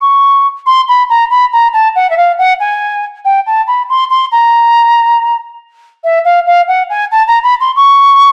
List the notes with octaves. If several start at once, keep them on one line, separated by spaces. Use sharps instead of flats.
C#6
C6
B5
A#5
B5
A#5
A5
F#5
E5
F5
F#5
G#5
G5
A5
B5
C6
C6
A#5
E5
F5
F5
F#5
G#5
A5
A#5
B5
C6
C#6